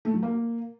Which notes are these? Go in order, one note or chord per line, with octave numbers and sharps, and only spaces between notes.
A3
F#3
A#3